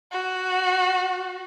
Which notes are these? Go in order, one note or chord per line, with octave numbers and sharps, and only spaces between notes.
F#4